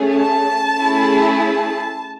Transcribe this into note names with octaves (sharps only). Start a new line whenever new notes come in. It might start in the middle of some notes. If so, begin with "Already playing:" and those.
Already playing: A3 C#4 G#4
A5
A3 C#4 E4 G#4
A5